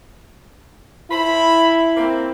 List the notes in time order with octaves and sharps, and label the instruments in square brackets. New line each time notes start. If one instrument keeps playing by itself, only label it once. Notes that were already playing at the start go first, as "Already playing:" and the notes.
[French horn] E4 [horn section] C5 A5 B5
[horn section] A#3 C4